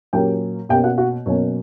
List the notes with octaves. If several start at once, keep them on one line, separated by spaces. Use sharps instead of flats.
A#2 F#3 A#3 C#4 G4 G5
B2 A#3 C#4 G4 G5
F#4 F#5
F#4 F#5
B2 F#3 A#3 C#4 C#5